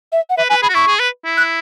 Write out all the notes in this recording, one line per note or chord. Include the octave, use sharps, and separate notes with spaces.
E5
F#5
B4 E5
B4 G#5
G#4 B5
F#4
E4 C#6
G#4
B4
E4
F#6